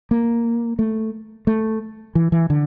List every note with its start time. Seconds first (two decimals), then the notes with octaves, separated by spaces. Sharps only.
0.11 A#3
0.79 A3
1.47 A3
2.15 E3
2.32 E3
2.50 D3